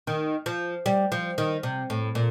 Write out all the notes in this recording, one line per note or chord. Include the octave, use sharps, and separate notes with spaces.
D#3
F3
G3
F3
D#3
C3
A2
A#2